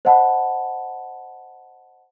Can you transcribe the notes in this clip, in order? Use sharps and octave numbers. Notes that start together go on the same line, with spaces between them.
C5 D#5 F#5 A5 B5